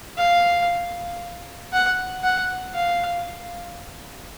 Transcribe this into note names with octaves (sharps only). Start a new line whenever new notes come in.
F5
F#5
F#5
F5